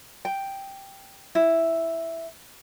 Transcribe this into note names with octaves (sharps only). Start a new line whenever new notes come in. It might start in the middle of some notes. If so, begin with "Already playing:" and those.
G5
E4